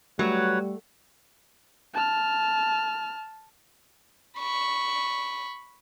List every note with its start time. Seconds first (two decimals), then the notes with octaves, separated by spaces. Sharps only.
0.19 F#3 G3 A3 B4 C#5 F#5
1.93 A5 F6
4.39 B5 C#6